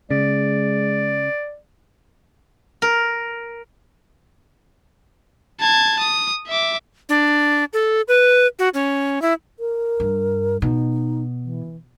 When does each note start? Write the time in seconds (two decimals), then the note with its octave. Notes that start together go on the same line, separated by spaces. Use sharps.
0.11 C#3 G#3 D5
2.82 A#4
5.60 A5 G#6
6.00 D#6
6.48 E5 D6
7.09 D4
7.73 A4
8.08 B4
8.59 F#4
8.74 C#4
9.22 E4
9.60 A#4
10.00 G2
10.62 B2 D#4
11.44 E3